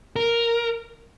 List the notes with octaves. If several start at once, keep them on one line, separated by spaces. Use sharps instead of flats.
A#4